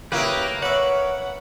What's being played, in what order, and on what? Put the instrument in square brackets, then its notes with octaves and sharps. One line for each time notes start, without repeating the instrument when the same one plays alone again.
[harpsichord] C#3 E4 G#4 [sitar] A#3 [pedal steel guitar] G4 B4
[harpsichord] B4 E5 [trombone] C#5 [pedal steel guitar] F#5